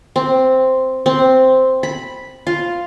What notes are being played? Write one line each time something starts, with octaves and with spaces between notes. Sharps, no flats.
C4
C4
B5
F4